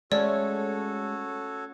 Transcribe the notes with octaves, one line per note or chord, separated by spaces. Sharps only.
G#3 A3 C#4 F#4 A4 C#5 D5